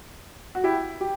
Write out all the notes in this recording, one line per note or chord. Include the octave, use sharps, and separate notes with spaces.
F#4
E4 G4
G4